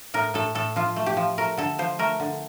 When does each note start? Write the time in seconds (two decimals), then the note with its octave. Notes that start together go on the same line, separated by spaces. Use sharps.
0.14 A2 A#4
0.34 A2 A4
0.55 A2 A4
0.76 F3 F4
0.96 A3
1.06 G4
1.17 F3
1.38 A3 A#4
1.57 D3 A4
1.79 F3 C5
1.99 A3 A#4
2.20 D3